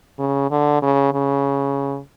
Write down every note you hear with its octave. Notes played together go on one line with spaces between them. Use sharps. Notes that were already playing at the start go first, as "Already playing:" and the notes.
C#3
D3
C#3
C#3